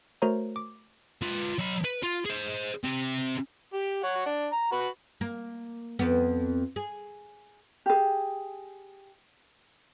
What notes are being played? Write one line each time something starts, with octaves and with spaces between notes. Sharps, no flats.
A3 F#4 A#4 C5 C#5 A#5
D6
F4 B4
F#3 B5
B4
F4
G#4 C5
C4 G4
G4
C#5 F#5
D4
A#5
F#4 B4
A#3
F2 B3
G#4
G4 G#4